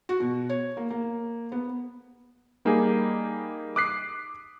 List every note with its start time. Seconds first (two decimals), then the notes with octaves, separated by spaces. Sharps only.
0.09 F#4
0.20 B2
0.49 C#5
0.77 A#3
0.90 A#3
1.52 B3
2.65 G3 A#3 D#4 G4 G#4
3.76 D6 D#6 F#6 B6 C7